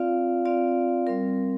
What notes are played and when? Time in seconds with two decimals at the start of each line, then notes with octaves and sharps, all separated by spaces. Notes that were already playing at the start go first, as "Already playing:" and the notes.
Already playing: C4 F4 D5 F5
0.45 C4 F4 D5 F5
1.07 G3 C4 A#4